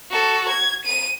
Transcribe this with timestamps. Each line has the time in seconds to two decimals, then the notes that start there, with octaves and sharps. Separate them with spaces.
0.10 F#4 A4
0.49 G#6
0.85 D#7